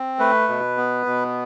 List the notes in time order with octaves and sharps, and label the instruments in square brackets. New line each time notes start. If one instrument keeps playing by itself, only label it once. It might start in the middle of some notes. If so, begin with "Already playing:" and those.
Already playing: [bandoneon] C4
A3 B4
B2
B3
B2